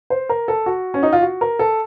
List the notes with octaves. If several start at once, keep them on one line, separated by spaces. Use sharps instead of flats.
C5
A#4
A4
F#4
C#4
D#4
F4
F#4
A#4
A4